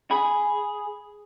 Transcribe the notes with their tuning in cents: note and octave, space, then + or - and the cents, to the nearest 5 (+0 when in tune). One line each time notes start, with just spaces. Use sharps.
G#4 +0 B5 +0